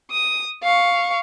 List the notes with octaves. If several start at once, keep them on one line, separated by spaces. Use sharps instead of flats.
D#6
F5 C#6